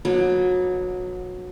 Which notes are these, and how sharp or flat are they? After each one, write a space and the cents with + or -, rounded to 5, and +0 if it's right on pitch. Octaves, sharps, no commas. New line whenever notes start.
F#3 -25 B3 -35 D4 +35